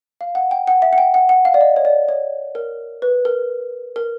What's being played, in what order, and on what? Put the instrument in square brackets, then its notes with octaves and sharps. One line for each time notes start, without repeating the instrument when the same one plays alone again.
[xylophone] F5
F#5
G5
F#5
E5
F#5
G5
F#5
F#5
F5
D5
D#5
C#5
D5
C#5
A#4
B4
A#4
A#4